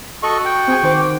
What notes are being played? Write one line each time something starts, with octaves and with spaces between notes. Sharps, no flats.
F#4 A4 D#5 C#6
G5
C4 G#4 G#5
D#3 C5 D6